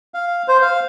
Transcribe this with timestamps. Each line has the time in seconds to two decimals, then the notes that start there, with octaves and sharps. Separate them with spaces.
0.14 F5
0.48 C5
0.62 F5